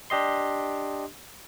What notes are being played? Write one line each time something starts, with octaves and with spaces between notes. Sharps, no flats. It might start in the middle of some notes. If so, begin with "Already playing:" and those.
D4 G4 D#5 C6